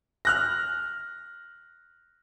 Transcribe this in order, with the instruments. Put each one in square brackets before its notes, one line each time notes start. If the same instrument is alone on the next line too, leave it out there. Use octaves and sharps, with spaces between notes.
[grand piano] F6 F#6 A#6